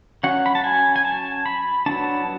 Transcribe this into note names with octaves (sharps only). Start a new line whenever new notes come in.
F#3 C#4 F#5
B5
A5
G#5
G#5
A5
B5
F#3 B3 D4 A5